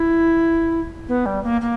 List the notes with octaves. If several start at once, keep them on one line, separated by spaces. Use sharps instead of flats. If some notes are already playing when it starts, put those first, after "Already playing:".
Already playing: E4
B3
G3
A#3
A#3